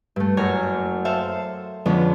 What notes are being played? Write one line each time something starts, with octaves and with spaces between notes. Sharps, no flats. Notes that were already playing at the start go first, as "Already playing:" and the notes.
G2 A3
F#1 F#2 C#5 G#5 F6 A#6
A4 C5 E5 F5
F2 D3 G#3 B3 C#4